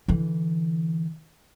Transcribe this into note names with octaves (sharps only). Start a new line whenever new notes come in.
D3 E3